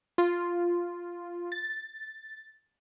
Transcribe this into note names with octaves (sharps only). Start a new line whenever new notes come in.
F4
A6